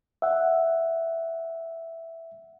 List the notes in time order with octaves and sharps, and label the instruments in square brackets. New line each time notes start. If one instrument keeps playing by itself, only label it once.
[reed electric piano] E5 F#5